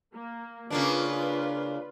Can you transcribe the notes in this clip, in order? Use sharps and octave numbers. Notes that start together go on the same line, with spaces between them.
A#3
C#3 A#3 D4 F4 B4